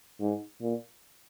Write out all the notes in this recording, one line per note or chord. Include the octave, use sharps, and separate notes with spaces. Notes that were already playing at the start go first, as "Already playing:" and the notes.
G#2
A#2